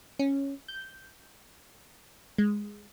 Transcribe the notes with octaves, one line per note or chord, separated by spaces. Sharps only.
C#4
G6
G#3